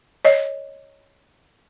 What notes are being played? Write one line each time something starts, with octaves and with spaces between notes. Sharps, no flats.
C#5 D#5